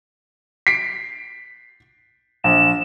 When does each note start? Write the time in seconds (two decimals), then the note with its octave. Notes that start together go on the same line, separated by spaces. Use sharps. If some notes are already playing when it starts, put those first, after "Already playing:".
0.67 B6 C7 D7
2.44 A#1 E7